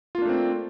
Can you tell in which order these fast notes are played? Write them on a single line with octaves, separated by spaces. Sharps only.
F4 A#3 D4 A3 C4